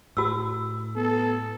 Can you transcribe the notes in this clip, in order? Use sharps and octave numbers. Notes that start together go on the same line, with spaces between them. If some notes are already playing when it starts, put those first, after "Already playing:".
A2 F#4 E6
B3 A4